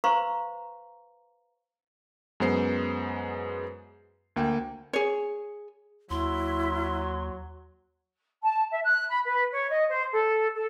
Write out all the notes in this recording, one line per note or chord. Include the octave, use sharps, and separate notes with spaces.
B4 C5 F5 A#5 C6 C#6
F#2 G#3 B3 C5 C7
D2 A#3 G5
G#4 C#5
D#2 F#3 E4 C6
A5
E5
F#6
B5
B4
C#5
D#5
C5
A4
A4